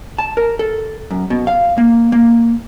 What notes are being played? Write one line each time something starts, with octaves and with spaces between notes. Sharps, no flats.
A5
A#4
A4
F#2
B2
F5
A#3
A#3